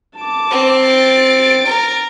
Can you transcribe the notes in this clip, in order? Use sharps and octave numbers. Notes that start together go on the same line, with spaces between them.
A5 D6
C4
A6 D7
A#4